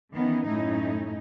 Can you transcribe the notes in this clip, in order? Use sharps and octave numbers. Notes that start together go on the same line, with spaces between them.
D#3 E3 B3 C#4 D#4
F#2 A2 A3 C#4 D#4 E4